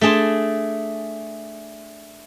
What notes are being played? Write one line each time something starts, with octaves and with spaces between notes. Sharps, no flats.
A3 D4 G#4 A5 C6